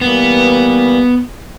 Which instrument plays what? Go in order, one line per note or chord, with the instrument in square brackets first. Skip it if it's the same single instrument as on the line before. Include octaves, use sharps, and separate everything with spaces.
[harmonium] E3 G3 A#3 [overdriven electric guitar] B3